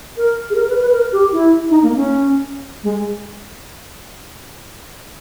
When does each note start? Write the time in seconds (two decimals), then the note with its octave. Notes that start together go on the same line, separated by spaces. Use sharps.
0.17 A#4
0.50 G#4
0.55 A#4
0.68 B4
0.81 B4
0.93 A#4
1.12 G4
1.32 E4
1.70 D#4
1.83 A#3
1.95 C#4
2.83 G#3